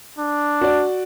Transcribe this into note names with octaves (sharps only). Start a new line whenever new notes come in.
D4
F#4 D5